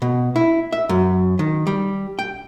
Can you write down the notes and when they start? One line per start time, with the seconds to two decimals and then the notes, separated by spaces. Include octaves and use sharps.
0.02 B2
0.36 E4
0.72 E5
0.89 F#2
1.39 D#3
1.67 G3
2.19 G5